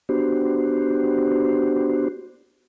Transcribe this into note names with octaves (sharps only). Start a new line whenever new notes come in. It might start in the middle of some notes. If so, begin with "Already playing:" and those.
B3 D4 F#4 G4 C5